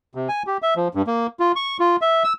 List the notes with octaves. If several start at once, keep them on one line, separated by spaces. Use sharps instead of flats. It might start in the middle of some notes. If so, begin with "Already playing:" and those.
C3
G#5
G4
E5
F3
G2
A#3
F4
C#6
F4
E5
E6